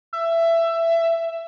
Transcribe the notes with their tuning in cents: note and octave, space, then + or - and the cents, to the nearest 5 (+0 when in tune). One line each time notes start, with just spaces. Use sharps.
E5 +15